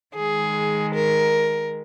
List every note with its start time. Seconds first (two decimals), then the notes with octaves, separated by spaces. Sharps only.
0.15 D#3 G#3 G#4
0.94 A#4